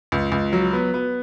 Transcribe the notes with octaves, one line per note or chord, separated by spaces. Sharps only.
C#2
C#2
F#3
B3
B3